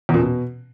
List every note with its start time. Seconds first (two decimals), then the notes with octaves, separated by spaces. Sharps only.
0.09 E2
0.14 A#2
0.19 B2